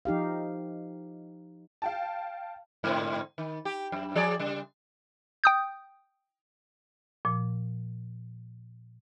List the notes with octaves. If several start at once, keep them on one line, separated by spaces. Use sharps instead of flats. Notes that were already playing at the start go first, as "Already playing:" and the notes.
F3 D#4 G4 F5
F5 G5 A5
G#2 D3 C4
D#3
G4
F#2
F3 G#4 D5
C#3 G3
G5 D#6 G6
A#2 F3